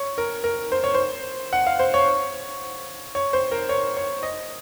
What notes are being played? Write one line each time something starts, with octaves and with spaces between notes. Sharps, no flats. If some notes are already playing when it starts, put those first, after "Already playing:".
Already playing: C#5
A#4
A#4
C5
C#5
C5
F#5
F5
C5
C#5
C#5
C5
A#4
C#5
C#5
D#5